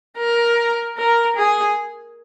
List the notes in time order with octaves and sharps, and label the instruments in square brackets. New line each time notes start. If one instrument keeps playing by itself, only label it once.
[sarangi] A#4
A#4
G#4